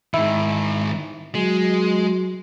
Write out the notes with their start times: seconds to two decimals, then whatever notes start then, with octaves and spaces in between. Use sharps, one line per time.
0.14 G#2 D#3 E4
1.35 F#3 G#3